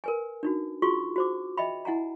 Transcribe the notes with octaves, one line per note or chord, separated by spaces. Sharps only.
A#4 B4 G#5
D4 D#4 F#4
F4 F#4 G#4 C6 C#6
F#4 C5 D6
D#5 E5 G5 B5
E4 F#5 G#5 A#5